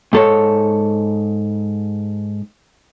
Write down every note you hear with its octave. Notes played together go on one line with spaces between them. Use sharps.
G#2 A4 C#5